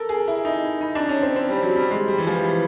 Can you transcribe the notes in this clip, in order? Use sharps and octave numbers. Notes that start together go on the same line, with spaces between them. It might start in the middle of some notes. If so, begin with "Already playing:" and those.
Already playing: A4 A#4
G#4
E4
D#4
D#4
D4
C#4
C4
C4
G3
F#3
G3
G#3
G3
E3
F3
E3